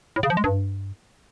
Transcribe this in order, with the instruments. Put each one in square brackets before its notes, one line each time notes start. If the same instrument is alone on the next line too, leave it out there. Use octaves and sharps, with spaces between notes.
[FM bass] A2
C#3
F3
G#3
G2